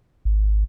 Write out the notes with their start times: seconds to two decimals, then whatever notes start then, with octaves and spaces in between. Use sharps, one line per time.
0.25 G#1